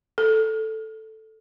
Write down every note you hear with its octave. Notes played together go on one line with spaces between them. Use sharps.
A4